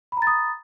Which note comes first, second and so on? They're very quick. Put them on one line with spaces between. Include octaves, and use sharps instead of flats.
B5 A#5 A6 D#6